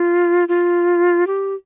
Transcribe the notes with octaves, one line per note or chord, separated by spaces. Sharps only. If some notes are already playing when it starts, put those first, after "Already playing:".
Already playing: F4
F4
G4